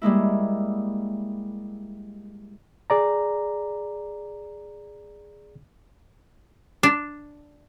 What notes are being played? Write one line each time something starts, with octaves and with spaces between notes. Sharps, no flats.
G3 G#3 A#3 E4
G#4 D5 A#5
D4